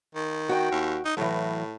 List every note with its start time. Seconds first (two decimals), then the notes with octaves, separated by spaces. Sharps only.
0.15 D#3
0.49 F#4 G5
0.71 D#2
1.05 D#4
1.17 A2 E3 F#3